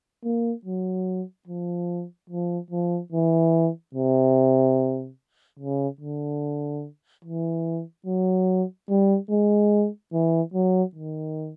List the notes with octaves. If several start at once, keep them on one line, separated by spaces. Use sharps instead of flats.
A#3
F#3
F3
F3
F3
E3
C3
C#3
D3
E3
F#3
G3
G#3
E3
F#3
D#3